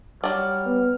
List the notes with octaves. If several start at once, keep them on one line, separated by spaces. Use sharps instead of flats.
F#3 G3 D5 F6
B3